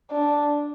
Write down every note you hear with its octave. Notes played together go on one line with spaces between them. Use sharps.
D4